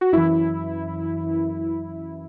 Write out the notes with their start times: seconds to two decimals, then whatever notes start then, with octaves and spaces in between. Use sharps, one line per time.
0.01 F#4
0.12 F#2 E3 E4